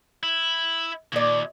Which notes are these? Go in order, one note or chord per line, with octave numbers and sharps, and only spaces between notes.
E4
D#2 A#2 D5